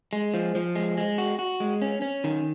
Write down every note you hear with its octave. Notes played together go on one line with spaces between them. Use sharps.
G#3
F3
F3
G#3
G#3
F#4
F#4
G#3
C#4
C#4
D#3